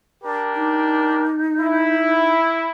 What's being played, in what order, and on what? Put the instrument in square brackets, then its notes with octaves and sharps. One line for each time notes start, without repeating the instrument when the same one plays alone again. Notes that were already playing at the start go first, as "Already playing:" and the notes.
[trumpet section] D4 G4 A#4
[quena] D#4
[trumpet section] E4